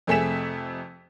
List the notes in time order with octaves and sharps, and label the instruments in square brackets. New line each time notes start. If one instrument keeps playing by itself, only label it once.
[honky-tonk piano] F2 C3 A3 G#4 B6 E7